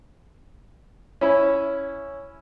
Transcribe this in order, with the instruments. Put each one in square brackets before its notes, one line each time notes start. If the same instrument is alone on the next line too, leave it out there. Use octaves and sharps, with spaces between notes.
[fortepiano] C#4 E4